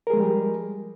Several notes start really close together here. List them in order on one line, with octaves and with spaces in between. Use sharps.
A#4 G#4 G#3 F3 G3